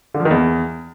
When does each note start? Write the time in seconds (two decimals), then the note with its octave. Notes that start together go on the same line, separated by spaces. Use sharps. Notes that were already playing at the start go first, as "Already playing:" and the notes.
0.14 D3
0.20 F3
0.25 D#3
0.31 E2